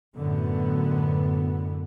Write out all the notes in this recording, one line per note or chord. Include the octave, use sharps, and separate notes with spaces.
F#2 A2 D3 B3